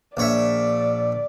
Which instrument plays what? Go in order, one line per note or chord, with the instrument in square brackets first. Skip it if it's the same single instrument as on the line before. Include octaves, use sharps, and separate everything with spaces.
[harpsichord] A#1 C#5 E5 [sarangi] D5